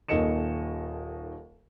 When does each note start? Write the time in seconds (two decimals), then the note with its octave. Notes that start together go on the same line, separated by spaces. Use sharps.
0.08 D#1 D#2 A4 D#5 C#7 E7